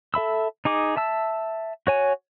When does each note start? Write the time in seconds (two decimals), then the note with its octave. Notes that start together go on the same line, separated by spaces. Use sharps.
0.14 A4 E5 B5 E6
0.65 D#4 G#4 D6
0.97 E5 A5 E6
1.87 F#4 C#5 G#5